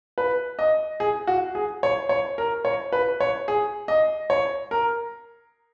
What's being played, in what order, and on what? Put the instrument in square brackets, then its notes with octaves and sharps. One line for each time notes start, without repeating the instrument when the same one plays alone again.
[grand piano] B4
D#5
G#4
F#4
G#4
C#5
C#5
A#4
C#5
B4
C#5
G#4
D#5
C#5
A#4